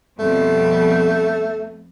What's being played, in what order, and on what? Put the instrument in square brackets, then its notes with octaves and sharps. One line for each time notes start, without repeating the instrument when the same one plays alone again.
[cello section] F2 B2 G3 [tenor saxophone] A3